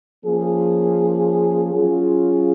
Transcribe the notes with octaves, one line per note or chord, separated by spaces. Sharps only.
F3 A#3 C#4 G#4
F#3 C#4 F4 G#4